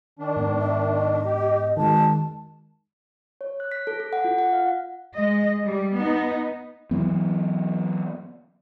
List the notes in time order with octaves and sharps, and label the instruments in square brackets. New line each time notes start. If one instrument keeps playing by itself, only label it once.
[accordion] D#3 D4
[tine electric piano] G#2 B3
[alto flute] E5
D#5
[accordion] G4
[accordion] B2 [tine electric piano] D#3 G#3 [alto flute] A5
[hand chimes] C#5
F#6
B6
A4
A4
F#5
F4
F#5
F5
[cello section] G#3 D#5
G3
B3 D#4
[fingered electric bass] E3 F#3 B3